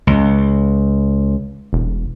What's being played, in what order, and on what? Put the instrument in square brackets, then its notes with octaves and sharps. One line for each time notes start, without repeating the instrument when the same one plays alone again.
[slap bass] C#2
[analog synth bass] E1